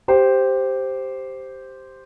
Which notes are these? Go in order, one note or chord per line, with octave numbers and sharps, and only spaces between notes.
G4 C5